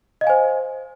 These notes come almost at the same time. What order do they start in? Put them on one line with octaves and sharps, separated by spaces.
D#5 F5 G#5 C5